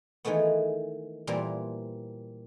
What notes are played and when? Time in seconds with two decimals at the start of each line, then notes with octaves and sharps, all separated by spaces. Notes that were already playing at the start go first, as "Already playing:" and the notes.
0.25 D#3 E3 G#3 A3 B3
1.27 A#2 E3 G3 A#3 C4